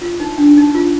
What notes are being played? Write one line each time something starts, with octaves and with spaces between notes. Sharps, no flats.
F4
D#4
D4
D#4
F4